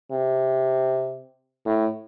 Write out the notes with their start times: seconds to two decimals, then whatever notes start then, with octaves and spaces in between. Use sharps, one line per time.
0.12 C3
1.66 A2